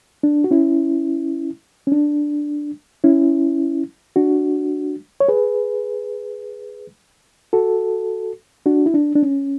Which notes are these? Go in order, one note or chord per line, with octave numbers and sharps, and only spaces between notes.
D4
F#4
C#4 E4
C#4
D4
C#4 E4
D4 F#4
C#5
G#4 B4
F#4 A4
D4 F#4
E4
D4
D4
C#4